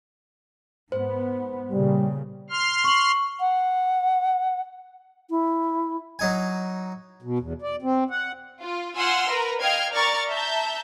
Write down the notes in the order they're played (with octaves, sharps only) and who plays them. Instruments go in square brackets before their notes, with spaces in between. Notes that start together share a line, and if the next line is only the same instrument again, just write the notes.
[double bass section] G#2 B3 [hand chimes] C5
[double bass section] A#2 C#3 [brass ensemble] G3
[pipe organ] C6 F6
[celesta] C#6 F#7
[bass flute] F#5
E4
[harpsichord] F#3 D#4 G#5
[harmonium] B2
E2
D5
C4
F#5
[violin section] F4
F4 F#5 G#5 C6 E6 F6
A#4 B4 A#5
D#5 F5 G5 F6 G#6 C7
A#4 D5 A#5 C#6 F6 A6
E5 A5 A#5 G6